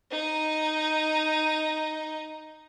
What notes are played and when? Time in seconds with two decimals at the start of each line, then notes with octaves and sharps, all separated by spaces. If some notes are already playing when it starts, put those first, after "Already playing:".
0.11 D#4 A#5